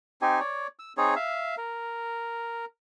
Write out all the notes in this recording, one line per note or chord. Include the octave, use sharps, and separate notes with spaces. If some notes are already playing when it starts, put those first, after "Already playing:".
C4 D#4 G4 G#5
C#5 D5
E6
C4 D#4 G#4 C#5
E5 F5
A#4